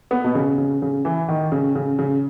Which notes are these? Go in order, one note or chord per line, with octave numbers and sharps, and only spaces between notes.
B3
B2
C#3
C#3
C#3
E3
D#3
C#3
C#3
C#3